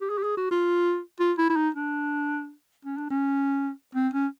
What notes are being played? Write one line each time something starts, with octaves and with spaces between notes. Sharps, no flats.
G4
G#4
G4
G#4
F#4
F4
F4
E4
E4
D#4
D4
C#4
D4
C#4
C4
C#4